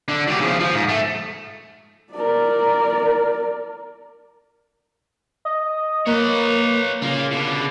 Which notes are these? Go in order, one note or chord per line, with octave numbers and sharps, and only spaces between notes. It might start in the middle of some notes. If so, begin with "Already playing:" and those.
D3
F#3 G4
C#3 F3
F3
G#2
A3
A#4 D5
D#5
A#3 B4 C#5
C#3 A#3 F4
B2 D3